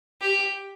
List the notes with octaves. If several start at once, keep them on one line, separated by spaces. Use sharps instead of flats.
G4